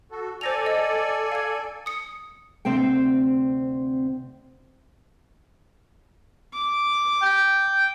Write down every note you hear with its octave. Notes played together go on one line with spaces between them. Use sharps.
F#4 A4
A4 C5 D5 G#5 A#6 F7
D#5
F5 G#6
D#6 C#7
D2 C3 C4 C5 G5
D6
G5